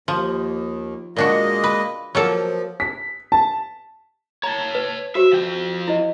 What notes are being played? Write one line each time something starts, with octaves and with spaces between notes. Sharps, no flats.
D#2 F3
A#2 G#3 A#3 D4 F#4 D#5
B4
F3 F#3 A#3 A4
B6
A5
C#5 A5 A#5
B4
F#4 G4 C5 E5
F3 G5
E4 C5 D#5